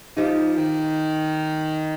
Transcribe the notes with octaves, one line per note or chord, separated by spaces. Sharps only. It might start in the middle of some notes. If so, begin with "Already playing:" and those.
F3 D#4 G4
D#3